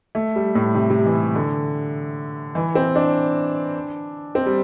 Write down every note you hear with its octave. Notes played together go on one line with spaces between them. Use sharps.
A3
G3
A2
C3
C3
E3
D3
E3
C4
D4
C4
G3